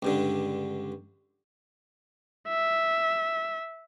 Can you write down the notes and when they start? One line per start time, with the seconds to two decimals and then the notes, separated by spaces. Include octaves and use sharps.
0.02 C#2 G2 D3
2.48 E5